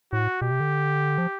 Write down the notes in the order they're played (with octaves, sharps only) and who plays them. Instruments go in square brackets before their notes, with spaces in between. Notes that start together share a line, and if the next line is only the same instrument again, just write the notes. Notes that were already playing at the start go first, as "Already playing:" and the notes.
[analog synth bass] A2 [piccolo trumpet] F#4
[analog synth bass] B2 [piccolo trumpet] G4
[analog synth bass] C3
D3
F3